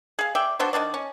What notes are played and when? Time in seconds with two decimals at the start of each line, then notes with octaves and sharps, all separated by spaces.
0.19 G#4 F5
0.35 D5 E5 G5
0.59 B3 D4 F#4 C5
0.73 D#3 F#3 D4 D5
0.94 C#4